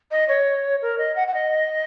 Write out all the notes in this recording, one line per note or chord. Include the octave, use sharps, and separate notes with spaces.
D#5
C#5
A#4
D#5
F#5
F#5
D#5